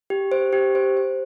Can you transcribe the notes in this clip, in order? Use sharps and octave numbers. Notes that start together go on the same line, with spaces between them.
G4
C5
G4
C5
C5